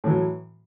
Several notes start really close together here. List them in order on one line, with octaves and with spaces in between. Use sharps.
A2 E3 F#3